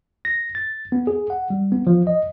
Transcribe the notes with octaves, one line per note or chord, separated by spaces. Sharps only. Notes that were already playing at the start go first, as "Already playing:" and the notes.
A#6
A6
B3
G#4
F#5
G3
B3
F3
D#5